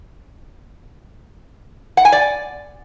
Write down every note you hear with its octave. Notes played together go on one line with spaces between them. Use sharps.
F#5
G#5
D5